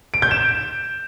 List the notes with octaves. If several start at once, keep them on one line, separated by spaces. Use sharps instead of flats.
D7
G6
E7